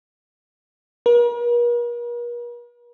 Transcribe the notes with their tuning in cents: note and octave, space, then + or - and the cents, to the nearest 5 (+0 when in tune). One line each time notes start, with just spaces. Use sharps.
A#4 +45